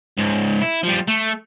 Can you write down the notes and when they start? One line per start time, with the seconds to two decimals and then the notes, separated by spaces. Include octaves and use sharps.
0.18 C#2 G#2
0.61 E4
0.83 F3 G3
1.07 A3